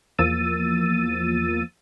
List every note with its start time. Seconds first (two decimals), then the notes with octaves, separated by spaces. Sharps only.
0.18 E2 F3 A#3 E6 A6 D#7